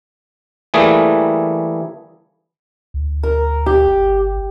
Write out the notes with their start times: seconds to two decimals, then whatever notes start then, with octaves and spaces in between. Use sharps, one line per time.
0.74 E3 G3 A3 A#3 G#4
2.94 D2
3.23 A#4
3.66 G4
3.88 G1